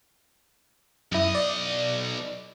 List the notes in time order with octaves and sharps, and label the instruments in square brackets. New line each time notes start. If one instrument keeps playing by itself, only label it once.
[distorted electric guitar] B1 D#5 [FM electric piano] F#2 E4
[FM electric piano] D5